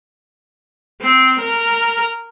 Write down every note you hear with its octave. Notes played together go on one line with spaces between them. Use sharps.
C4
A#4